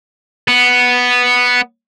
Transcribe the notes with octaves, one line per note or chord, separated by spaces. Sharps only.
B3